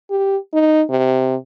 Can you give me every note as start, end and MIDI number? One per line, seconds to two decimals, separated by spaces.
0.10 0.37 67
0.53 0.82 63
0.90 1.36 48